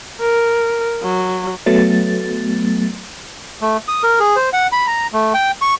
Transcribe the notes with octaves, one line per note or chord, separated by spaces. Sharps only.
A#4
F#3
F#3 A3 B3 A6
A3
D#6
A#4
G#4
C5
F#5
B5
A#5
A3
G5
C#6